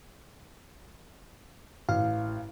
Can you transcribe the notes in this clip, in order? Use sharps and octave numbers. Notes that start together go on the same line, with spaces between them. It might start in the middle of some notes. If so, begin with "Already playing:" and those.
A1 F5